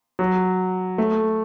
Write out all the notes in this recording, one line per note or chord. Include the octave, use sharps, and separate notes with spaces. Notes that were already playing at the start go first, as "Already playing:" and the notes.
F#3
A3